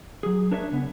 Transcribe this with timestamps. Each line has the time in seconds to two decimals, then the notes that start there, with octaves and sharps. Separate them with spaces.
0.23 F#3 G#4
0.51 D4 A#4 B4 C#5 D5 E5
0.71 C#3 B3